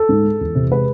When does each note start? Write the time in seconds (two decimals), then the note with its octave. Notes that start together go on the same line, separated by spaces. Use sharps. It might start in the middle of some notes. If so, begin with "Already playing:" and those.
Already playing: A4
0.09 G#2
0.24 G#3
0.41 E2
0.55 C3
0.70 G#3 B4